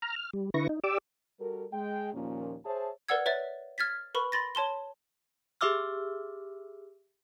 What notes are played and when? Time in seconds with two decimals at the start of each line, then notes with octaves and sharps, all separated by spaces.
0.02 A#5 F6
0.16 F6
0.33 G3
0.54 D3 E4 B4 C#6 A#6
0.69 D#4
0.84 G4 D5 D6 E6
1.39 G3 F#4 A4 A#4
1.72 G#3 G5
2.13 D#2 A#2 F3 A#3 C#4
2.65 G#4 C5 C#5 E5 A5
3.09 A#4 B4 D5 F#5 E6 G#6
3.26 B4 C#5 E5 A6
3.78 F6 G#6 A6 B6
4.15 A#4 B4 B5 C#6
4.32 B5 C6 A6 A#6
4.55 C#5 A5 C6 G7
5.61 G4 G#4 E5 D6 E6 F6